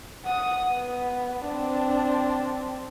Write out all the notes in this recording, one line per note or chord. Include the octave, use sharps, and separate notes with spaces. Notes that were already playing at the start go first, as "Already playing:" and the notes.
F#5 D#6
B3
C4 D4